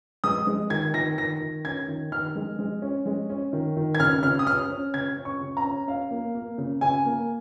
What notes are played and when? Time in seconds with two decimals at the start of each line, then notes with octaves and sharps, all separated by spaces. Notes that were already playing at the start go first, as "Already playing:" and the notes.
0.24 G#3 D#6
0.47 G#3
0.70 D#3 G#6
0.94 D#3 A#6
1.18 D#3 A#6
1.41 D#3
1.65 C#4 G#6
1.88 D#3
2.12 D#3 F6
2.36 G#3
2.59 G#3
2.82 C#4
3.06 G#3
3.29 C#4
3.53 D#3
3.77 D#3
3.95 G#6
4.00 C#3 F6
4.23 C#3 F6
4.39 D#6
4.47 C#4 F6
4.70 C#4
4.94 C#3 G#6
5.17 C#4
5.25 C#6
5.41 C#3
5.57 A#5
5.64 C#4
5.87 C#4 F5
6.11 A#3
6.35 A#3
6.58 C#3
6.81 C#3 G#5
7.05 A#3